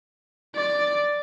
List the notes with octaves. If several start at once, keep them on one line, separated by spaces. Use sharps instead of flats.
D5